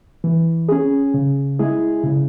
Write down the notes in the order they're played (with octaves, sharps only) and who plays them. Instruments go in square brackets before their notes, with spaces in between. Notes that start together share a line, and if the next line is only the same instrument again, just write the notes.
[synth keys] E3
C#4 G#4
C#3
G#3 E4 G#4
C#3